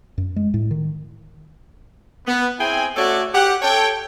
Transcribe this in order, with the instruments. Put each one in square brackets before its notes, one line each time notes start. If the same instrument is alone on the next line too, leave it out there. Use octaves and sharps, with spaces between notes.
[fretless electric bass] F#2
G#3
A2
D#3
[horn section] B3
C4 E4 G#4 G5 G#5
A3 F#4 A4 C#5 D5
G4 F#5
A4 C#5 G5